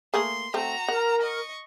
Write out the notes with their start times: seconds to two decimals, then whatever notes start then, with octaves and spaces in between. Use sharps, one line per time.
0.14 A3 A#3 G#4 C6
0.54 A3 C4 F#4 A#5
0.88 A#4 F#5
1.22 D#5 C#6